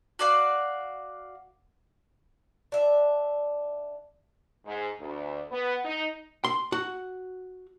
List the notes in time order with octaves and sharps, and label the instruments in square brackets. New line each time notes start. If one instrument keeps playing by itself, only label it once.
[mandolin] F#4 D5 F5
[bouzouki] D4 E5
[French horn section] G#2
D2
B3
D#4
[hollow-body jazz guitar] C6
F#4